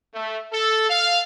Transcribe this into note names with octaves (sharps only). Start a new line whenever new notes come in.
A3
A4
F5